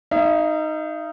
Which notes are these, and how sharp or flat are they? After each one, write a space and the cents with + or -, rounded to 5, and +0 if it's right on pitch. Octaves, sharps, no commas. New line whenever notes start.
D#4 +0 E5 +45